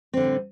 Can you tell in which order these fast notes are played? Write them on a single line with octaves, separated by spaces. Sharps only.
C4 D3 G3 A2